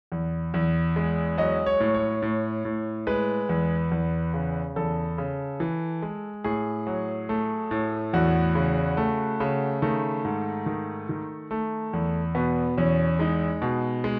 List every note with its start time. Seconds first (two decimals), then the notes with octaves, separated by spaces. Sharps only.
0.12 E2
0.54 E2
0.96 G#3
1.38 F#3 D#5
1.66 C#5
1.80 A2
1.94 C#5
2.22 A2
2.65 A2
3.07 G#3 B4
3.49 E2
3.91 E2
4.34 C#3
4.76 E2 A4
5.18 C#3
5.60 E3
6.02 G#3
6.44 A2 G#4
6.87 F#3
7.29 A3
7.71 A2
8.13 E2 F#4
8.55 C#3
8.97 A3
9.40 C#3
9.82 D#3 A3
10.25 G#2
10.66 D#3
11.09 D#3
11.51 A3
11.93 E2
12.35 B2 B3
12.78 E2 C#4
13.19 G#3 D#4
13.62 B2
14.04 G#3